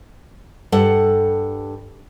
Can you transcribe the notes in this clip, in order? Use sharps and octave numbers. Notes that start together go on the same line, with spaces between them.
G2 A4 F#5